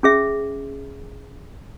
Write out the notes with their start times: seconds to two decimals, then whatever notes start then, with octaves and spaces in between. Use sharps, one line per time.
0.03 C#4 G#4 E5